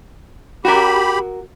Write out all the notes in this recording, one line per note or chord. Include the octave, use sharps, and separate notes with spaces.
F#4 G4 A#4 B5